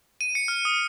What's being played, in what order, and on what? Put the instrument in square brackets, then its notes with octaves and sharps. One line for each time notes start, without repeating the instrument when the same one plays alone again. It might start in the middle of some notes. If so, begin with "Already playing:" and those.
[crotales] D#7
C#7
F6
D#6